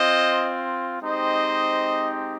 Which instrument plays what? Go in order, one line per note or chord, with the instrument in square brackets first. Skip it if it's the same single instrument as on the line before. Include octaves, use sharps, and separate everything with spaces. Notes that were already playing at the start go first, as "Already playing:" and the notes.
Already playing: [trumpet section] C4 F4 C5 D#5
G#3 C4 D#4 G4 C5 D#5